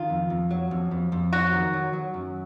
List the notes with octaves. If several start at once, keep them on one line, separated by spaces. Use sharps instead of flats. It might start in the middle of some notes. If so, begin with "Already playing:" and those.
Already playing: D#3 F4
F2
F2
F#3
F2
F2
F2
F#3 F#4
D#3
F#3
F#3
F#2